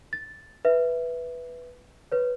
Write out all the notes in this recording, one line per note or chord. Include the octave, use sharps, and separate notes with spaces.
A6
B4 E5
B4 C#5